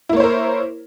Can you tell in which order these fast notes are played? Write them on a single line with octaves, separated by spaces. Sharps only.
E4 A#3 C#5 C5 A#4